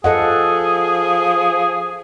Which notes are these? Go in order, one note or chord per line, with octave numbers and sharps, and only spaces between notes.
F3 G#4 A4 D#5 F#5